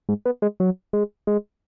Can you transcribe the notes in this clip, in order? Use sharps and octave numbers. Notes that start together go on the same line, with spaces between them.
G#2
B3
G#3
F#3
G#3
G#3